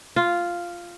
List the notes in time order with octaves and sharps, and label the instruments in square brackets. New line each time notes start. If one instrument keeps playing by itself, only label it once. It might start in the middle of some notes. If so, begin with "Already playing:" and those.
[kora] F4